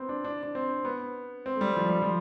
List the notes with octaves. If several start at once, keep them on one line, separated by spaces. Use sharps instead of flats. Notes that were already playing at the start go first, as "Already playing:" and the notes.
Already playing: B3 C4
D4
D4
D4
C4
B3
C4
A3
G3
F3
G3
F3